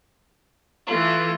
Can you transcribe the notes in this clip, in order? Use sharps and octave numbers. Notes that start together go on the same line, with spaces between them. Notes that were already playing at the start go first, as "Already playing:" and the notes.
E3 A3 F4